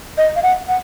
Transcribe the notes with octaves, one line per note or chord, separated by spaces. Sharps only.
D#5
F5
F#5
F#5